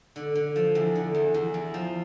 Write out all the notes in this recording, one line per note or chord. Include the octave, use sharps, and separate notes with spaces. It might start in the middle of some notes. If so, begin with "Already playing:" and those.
D3
D3
F3
E2
D3
E2
E2
E2
F3